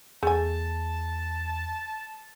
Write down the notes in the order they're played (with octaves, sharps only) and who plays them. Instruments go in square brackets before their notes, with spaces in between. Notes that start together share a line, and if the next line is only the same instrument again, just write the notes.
[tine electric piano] E2 [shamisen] A3 G#5 [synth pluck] G#4 [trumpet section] A5